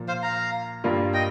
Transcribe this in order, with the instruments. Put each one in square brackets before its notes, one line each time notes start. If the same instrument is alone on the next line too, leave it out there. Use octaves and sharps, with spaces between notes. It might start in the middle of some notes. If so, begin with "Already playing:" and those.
Already playing: [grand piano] A#2 F3 A#3
[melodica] C5 F5
F5 A#5
[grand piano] G2 G3 A#3 F4
[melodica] D#5 G5